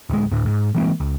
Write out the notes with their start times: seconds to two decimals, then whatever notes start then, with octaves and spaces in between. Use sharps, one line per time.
0.10 D1 G#3
0.31 D2 A2
0.46 G#2
0.75 E3 G#3 A#3 C4
1.00 C#2